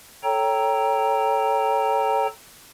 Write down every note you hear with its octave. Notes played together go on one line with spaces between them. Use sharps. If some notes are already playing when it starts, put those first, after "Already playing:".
A4 C#5 G5 A#5